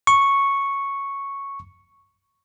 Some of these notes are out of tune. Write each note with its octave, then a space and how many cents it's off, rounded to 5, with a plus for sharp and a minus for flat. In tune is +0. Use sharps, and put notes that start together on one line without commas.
C#6 -5